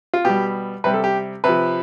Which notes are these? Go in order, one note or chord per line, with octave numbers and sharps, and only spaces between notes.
F4
B2 G3 G4
C3 G3 B4
A4
G4
C3 F3 B4